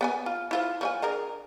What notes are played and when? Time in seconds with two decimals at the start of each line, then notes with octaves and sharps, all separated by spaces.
0.01 B3 G5 G#5
0.26 F4
0.51 E4 F4 C5
0.81 F3 C#5 G#5
1.02 D4 G#4 A#4